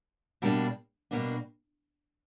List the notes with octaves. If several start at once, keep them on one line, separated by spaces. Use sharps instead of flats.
B2 G3 A#3 D4
B2 G3 A#3 D4